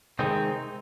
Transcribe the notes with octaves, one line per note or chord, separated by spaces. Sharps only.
C3 D#3 G#3 C4 D#4